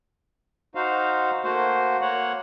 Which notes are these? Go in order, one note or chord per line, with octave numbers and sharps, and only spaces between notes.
D#4 F#4 C5 F5
A3 A#3 F#4 C5
A#3 C#5 F#5